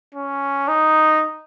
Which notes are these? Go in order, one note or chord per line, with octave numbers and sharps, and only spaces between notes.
C#4
D#4